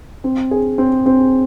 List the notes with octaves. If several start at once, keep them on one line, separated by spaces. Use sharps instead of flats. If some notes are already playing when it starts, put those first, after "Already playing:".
C4
G#4
C4
C4